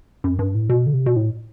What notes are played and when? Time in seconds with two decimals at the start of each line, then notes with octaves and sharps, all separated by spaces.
0.24 F#2
0.39 G2
0.55 A2
0.69 B2
0.86 D3
0.93 C3
1.06 B2
1.16 A2